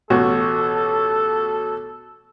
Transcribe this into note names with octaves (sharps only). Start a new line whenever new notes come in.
A1 B2 F#4 A4